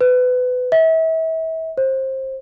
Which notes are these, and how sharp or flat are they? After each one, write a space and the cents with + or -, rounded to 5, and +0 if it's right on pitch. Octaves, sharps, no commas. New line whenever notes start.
B4 +25
E5 -35
C5 +25